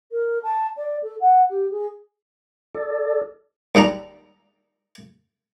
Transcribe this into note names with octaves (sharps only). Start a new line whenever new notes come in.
A#4
A5
D5
A4
F#5
G4
G#4
A4 D5
D#2 G3 D4 A#5